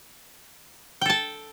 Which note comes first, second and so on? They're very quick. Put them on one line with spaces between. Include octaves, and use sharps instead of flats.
G5 A4 A5